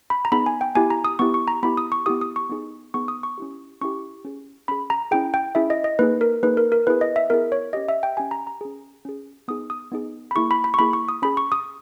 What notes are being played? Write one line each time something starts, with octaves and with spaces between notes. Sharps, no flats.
B5
A#5
B3 D#4 G#4 B5
G#5
G5
B3 E4 G4 G#5
A#5
D#6
B3 E4 G4 C#6
C#6
A#5
B3 E4 G4 B5
D#6
C#6
B3 E4 G4 D#6
D#6
C#6
B3 D#4 G#4
B3 D#4 G#4 C#6
D#6
C#6
C#4 E4 G4
C#4 E4 G4 C#6
C#4 G#4
C#4 G#4 B5
A#5
C#4 E4 G#4 G5
G5
C#4 E4 G#4 E5
D#5
D#5
A#3 D#4 G#4 B4
A#4
A#3 D#4 G#4 B4
A#4
A#4
B3 E4 G#4 B4
D#5
E5
B3 E4 G#4 A#4
C#5
C#4 G4 D#5
E5
G5
C#4 G4 G#5
A#5
A#5
C#4 G#4
C#4 G#4
B3 D#4 G#4 D#6
D#6
B3 D#4 G#4
B5
A#3 E4 G#4 C#6
B5
B5
C#6
A#3 E4 G#4 B5
C#6
D#6
C#4 G#4 B5
C#6
D#6